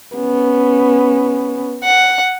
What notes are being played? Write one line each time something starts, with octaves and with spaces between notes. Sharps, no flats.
B3 C#4
F#5